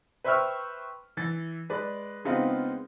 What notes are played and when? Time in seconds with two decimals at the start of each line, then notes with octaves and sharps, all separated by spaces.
0.24 B4 C5 E5 G5 C#6 F6
1.17 E3 A6
1.70 G#3 B4 D5
2.25 C#3 G#3 B3 C4 D#4 F4